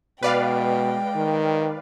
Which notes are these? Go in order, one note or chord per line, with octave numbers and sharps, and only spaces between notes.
B2 G#3 B4 D5 F5 G5
D#3